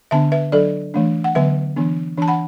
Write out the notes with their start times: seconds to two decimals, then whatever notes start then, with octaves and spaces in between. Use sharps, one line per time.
0.11 D3 B3 D4 E5 A5
0.32 B4 E5
0.52 F#3 D4 A4 D5
0.94 E3 A3 D4
1.24 F#5
1.35 D3 F#3 B3 B4 E5
1.76 E3 B3 D4
2.17 E3 D4 A5
2.28 F#5 B5